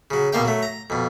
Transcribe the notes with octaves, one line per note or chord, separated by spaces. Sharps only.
C#3 F#3
B1 B2 A#3 F5 G5
F#3 A3
A#5
F2 B2